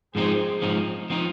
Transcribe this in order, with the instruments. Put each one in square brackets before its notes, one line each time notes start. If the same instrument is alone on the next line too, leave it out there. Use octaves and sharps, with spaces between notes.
[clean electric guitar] G#2 F3 C4 D#4 [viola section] G#4 C5
[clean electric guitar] G#2 F3 C4 D#4
F3 C4 D#4